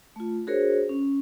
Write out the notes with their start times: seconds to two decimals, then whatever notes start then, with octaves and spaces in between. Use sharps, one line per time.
0.16 A3 F4
0.47 D4 F#4 G#4 A#4 C5 C#5
0.89 C#4